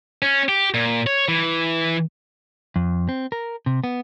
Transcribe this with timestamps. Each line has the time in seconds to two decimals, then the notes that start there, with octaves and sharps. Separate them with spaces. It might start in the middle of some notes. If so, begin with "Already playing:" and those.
0.22 C#4
0.49 G4
0.74 A#2
1.07 C#5
1.28 E3
2.76 F2
3.09 C4
3.32 A#4
3.66 C3
3.84 B3